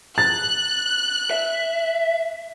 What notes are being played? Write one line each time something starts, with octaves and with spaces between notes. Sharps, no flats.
F#6 A6
E5